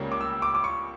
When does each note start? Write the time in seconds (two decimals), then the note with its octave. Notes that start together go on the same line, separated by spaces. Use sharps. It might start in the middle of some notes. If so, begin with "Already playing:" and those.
Already playing: C#2 C#3 G3 A#3 C#4
0.12 D6
0.21 E6
0.42 D6
0.55 D6
0.64 C#6